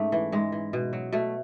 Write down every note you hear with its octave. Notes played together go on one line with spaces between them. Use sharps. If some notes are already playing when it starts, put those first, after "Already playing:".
Already playing: G#2 A3 C#4
E3
G#2 G#3
E3
B2
F#3
B2 A3